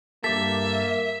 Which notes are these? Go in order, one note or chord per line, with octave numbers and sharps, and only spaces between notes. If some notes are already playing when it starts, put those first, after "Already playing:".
G2 A#3 G4 A4 E5 B6